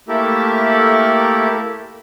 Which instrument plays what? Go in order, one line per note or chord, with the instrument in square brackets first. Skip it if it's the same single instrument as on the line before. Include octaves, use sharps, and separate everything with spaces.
[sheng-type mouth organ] A3 A#3 E4 G4 A4 A#4